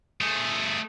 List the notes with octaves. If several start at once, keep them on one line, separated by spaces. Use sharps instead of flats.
A3 G#4